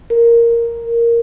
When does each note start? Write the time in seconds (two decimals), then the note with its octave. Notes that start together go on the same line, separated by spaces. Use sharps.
0.10 A#4